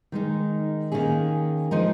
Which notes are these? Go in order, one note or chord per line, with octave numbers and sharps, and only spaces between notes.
D#3 G#3 D#4 A#4
D#3 A#3 C#4 G#4
F3 G#3 D#4 A#4